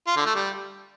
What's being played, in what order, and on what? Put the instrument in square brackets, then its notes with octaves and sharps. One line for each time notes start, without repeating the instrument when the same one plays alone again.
[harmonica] F4
D3
A3
G3